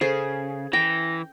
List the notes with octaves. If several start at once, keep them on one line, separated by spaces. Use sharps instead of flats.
C#3 C#4 G#4 A4 C5
E3 G5 A#6